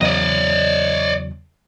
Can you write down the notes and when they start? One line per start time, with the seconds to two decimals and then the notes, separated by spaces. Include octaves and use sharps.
0.01 E2 C#3 F#3 D5 D#5